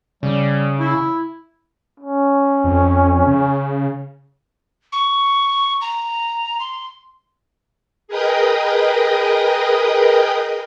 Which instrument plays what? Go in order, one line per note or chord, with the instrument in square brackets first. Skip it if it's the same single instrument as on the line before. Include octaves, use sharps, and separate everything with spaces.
[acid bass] C#3 [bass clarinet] G3
[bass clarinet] E4
[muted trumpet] C#4
[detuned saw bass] F2
C#3
[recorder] C#6
A#5
C6
[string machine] G#4 A#4 B4 D#5 G5 D#6